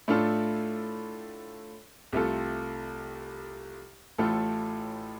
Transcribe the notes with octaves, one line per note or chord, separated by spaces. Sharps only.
A2 A3 D4 F4 A4
C2 C3 A3 F4 A4
A1 A2 A3 F4 A4